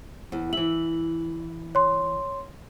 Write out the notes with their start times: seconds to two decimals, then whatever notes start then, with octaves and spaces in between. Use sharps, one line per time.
0.32 E2
0.53 E3 E5 F#7
1.75 C#5 C6